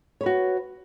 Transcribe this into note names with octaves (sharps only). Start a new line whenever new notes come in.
F#4 B4 C#5